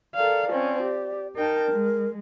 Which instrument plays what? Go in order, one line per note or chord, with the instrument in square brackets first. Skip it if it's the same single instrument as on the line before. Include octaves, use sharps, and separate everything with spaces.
[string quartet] A4 A#4 F5 [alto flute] D5
[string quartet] F3 C4 C#4
G4
[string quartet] D#4 G5 A5 [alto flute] A#4
[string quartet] G#3